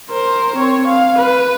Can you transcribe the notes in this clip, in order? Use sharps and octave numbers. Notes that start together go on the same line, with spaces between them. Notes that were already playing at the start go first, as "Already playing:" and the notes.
A#4 C5
C4 C#5
F5
B4